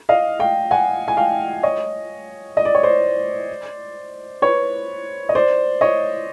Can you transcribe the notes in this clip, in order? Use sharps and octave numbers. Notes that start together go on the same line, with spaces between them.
D#5 F5
F5 G5
F#5 G#5
G#5
F5 G5
C#5 D#5
D#5
D5
C#5
C5 D5
B4 C#5
D#5
C5 D5
C#5 D#5